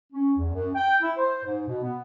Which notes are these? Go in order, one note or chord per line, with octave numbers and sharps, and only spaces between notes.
C#4
E2
F#2
G5
E4
C5
G#2
B2
B3